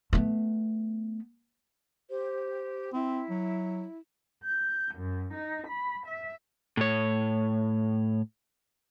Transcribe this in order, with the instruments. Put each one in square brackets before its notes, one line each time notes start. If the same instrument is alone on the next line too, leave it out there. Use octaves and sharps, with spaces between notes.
[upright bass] A3 B3
[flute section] G4 C5
[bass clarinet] C4 [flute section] E4
[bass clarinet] F#3
[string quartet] G6
F#2
D#4
B5
E5
[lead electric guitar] A2 C#5